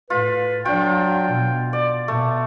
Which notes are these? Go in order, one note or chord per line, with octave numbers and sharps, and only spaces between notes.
A2 F4 B4
F#3 D4 F4 G5
B2
D5
B2 A3